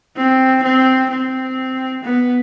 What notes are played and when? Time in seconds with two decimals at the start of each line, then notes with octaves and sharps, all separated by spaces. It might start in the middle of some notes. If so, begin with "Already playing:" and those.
0.16 C4
0.63 C4
1.10 C4
2.03 B3